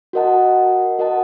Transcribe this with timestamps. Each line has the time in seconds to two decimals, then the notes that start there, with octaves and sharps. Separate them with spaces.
0.13 F#4 A#4 D#5 F#5 A5
0.99 F#4 A#4 D#5 F#5 A5